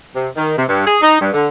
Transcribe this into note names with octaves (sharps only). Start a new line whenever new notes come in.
C3
D#3
C3
G2
G#4
D#4
G2
D3